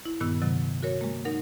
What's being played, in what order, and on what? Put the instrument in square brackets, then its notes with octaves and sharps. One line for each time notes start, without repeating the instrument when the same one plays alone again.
[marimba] E4
G2 A#2 D#3 B3 E6
C3 D#3 F#3
F#4 A#4 C#5
G#3 A#3
D#4 A#4 F#5